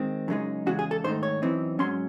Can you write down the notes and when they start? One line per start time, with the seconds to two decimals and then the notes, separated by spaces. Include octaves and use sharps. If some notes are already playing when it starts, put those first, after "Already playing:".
Already playing: D#3 G#3 C4
0.28 F#2 C#3 G#3 D#4
0.66 E2 C#3 G#3 F#4
0.79 G#4
0.91 A4
1.04 G#2 D#3 A3 D#4 C5
1.23 C#5
1.42 F#2 E3 C4 D#4
1.79 G#2 F#3 C#4 C6